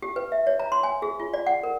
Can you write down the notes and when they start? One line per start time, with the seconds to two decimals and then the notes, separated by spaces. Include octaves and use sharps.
0.02 G4
0.16 B4
0.32 E5
0.47 C#5
0.59 A#5
0.72 C6
0.83 G#5
1.02 G#4
1.20 F4
1.33 D5
1.46 F#5
1.63 A#4